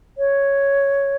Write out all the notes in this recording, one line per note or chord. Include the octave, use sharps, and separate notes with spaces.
C#5